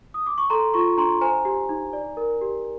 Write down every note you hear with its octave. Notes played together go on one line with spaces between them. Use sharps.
D#6
D6
C#6
A4 A#5 C6
F4 B5 C#6
D4 A#5 C6
C5 G#5 A#5
G4
D#4
D5
A#4
G4